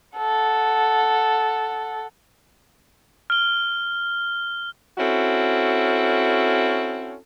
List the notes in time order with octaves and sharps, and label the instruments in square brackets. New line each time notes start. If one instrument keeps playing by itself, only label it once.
[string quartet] A4 F#5
[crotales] F6 G7
[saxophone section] C4 C#4 E4 F#4 A4